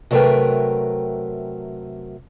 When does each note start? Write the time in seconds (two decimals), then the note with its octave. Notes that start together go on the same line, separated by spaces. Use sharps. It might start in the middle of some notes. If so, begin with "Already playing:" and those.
0.11 C3 F#3 A3 A#4 B4 G5